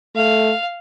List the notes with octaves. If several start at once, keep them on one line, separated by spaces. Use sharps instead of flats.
A3 F5